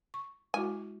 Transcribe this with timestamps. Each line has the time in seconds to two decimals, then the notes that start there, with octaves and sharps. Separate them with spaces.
0.14 C#6
0.54 G#3 E4 F#4 G#5